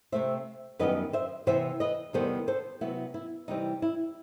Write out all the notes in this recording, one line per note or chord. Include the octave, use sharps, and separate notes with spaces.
C3 D#3 A3 C4 C5 E5
F#2 D#3 G3 B3 B4 D#5
C5 E5
C3 E3 B3 C5 E5
B4 D#5
E2 C3 D#3 G3 B3 A4 C5
A4 C5
C3 F#3 B3 E4
E4
C3 E3 G3 C4 D#4
E4